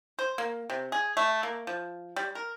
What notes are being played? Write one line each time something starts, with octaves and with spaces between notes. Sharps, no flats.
C5
A#3
C3
G#4
A3
A#3
F3
G3
A#4